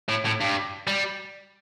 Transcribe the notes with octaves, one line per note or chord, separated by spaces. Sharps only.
A2
A2
G2
G3